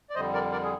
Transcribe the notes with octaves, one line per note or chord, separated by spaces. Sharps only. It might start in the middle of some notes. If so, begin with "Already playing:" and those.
D5
F2 D3 G3 C5 D#5
A#4 D5
A#4 D5
G#4